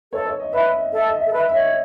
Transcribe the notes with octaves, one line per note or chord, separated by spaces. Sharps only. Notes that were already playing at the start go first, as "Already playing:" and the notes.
A4 C#5
C#5
D#5
B4 E5
D#5
A4 E5
D#5
E5
A4
B4 E5
E5
C#5 D#5